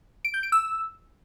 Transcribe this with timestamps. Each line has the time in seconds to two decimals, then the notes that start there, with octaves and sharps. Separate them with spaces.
0.25 D7
0.34 G6
0.43 D7
0.52 E6